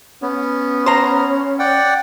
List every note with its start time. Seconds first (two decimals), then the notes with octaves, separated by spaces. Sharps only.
0.22 B3 C#4
0.86 C5 A#5
1.59 D5 F#5 G5